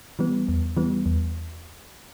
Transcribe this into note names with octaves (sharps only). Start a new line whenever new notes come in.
E3 G3 B3
E2
E3 G3 B3
E2